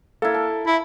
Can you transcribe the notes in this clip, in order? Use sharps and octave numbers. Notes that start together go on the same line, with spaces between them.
A#3 E4 A4
A5
E4